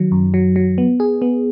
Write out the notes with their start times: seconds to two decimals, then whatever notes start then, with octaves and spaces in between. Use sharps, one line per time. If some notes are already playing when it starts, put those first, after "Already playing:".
Already playing: D#3 F#3
0.12 F#2
0.34 F#3
0.56 F#3
0.78 B3
1.00 G#4
1.22 B3